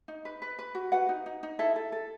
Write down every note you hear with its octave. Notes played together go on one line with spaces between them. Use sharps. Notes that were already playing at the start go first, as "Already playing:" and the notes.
D#4
B4
B4
B4
F#4
F#4 B4 F#5
D#4
D#4
D#4
E4 A4 E5
A4
A4